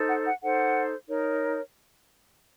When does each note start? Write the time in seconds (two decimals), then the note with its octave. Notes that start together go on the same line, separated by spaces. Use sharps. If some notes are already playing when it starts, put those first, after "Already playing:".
Already playing: D#4 A4 C5
0.08 F#5
0.26 F#5
0.42 D#4 A4 C5 F#5
1.07 D#4 A#4 C#5